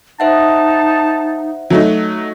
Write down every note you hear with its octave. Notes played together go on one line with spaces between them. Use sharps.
D#4 C5 E5 F#5 A5
F#3 A3 D#4